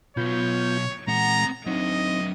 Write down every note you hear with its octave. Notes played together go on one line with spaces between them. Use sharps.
B2 F#3 B3 F4 C#5 G6
A#2 E3 G#3 C4 F#5 A#5
F#3 C4 D4 D#4 D#5